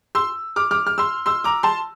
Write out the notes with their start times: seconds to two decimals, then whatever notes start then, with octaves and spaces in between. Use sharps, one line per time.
0.15 C6 E6
0.56 D6 F6
0.71 D6 F6
0.87 F6
0.98 C6 E6
1.26 C6 E6
1.44 A#5 D6
1.63 A5 C6